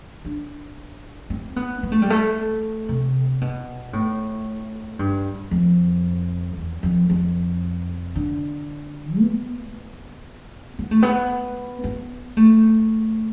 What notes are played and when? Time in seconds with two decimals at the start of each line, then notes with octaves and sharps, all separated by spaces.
0.25 D4
1.30 C4
1.56 B3
1.83 B3
1.92 A3
2.02 G3
2.10 A3
2.89 C3
3.41 B2
3.93 A2
4.99 G2
5.51 F2
6.57 E2
6.83 F2
7.09 F2
8.15 D3
9.20 B3
10.79 B3
10.91 A3
11.02 B3
11.84 B3
12.37 A3